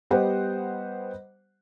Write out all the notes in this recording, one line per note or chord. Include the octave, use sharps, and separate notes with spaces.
G3 B3 G4 C5 D#5 F#5